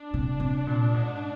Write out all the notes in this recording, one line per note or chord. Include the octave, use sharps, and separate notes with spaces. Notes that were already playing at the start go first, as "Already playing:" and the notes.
Already playing: D4
C3
C3
A#2
G#2